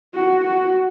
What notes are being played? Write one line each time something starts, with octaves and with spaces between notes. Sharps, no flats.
F#4
F#4